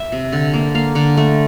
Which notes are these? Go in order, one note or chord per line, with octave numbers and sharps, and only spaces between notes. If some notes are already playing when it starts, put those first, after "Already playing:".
Already playing: E5
C3
D3
A#3
A#3 F5
D3
A3